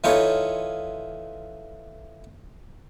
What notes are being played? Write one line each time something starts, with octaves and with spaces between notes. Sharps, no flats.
E3 D#4 F4 A4 C#5